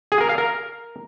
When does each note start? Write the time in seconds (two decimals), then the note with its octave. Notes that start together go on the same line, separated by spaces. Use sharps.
0.12 G#4
0.21 A#4
0.29 F5
0.38 A#4